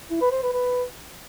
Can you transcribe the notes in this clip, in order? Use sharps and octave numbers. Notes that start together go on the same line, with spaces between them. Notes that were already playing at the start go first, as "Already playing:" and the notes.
E4
B4
C5
B4
B4